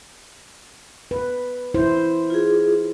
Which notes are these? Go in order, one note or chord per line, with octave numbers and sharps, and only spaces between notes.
B4
E4 C5
F4 G#4